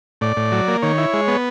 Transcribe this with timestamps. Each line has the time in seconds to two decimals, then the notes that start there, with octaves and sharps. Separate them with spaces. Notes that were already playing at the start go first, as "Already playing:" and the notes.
0.21 A2 D5
0.37 A2
0.52 F#3
0.68 A#3
0.82 D#3 C#5
0.98 E4
1.13 G#3
1.28 B3